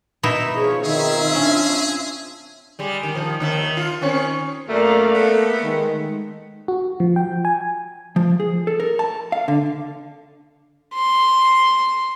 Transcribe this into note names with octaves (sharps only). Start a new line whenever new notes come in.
B2 D#4 E4
F3 G#4 C#5
D#3 C4 F4 G#4 E5
C#4 D4
G3 G#3
D#3
D#3 F3
D#2 D#3 E5
F4
D#3 C4 C#4
F#2 A3 A#3 A#4 D5 F5
B3 A4
D#3 G#3
F#4
F3
G5
G#5
F3
G#4
A4
A#4
A5
F5
D3
C6